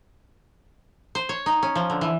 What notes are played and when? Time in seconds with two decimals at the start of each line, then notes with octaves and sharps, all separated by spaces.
1.15 C5
1.29 C#5
1.46 D#4
1.63 C#4
1.75 F3
1.90 D3
2.01 E3